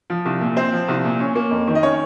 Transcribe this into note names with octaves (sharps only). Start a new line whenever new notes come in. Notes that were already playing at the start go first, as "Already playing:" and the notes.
F3
C2
A#2
C4 C5
F3
C2
A#2
C#4
A#3
F2
D#3
D#5
C#4 C#5